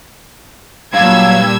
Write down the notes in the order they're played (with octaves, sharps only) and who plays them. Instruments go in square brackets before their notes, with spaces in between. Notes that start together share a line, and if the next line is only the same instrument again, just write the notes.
[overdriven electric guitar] G2 [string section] A#2 E6 G#6 [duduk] F#3 [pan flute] F5